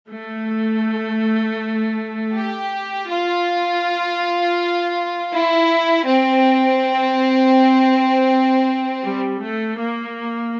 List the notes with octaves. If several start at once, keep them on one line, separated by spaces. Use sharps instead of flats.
A3
G4
F4
E4
C4
G3
A3
A#3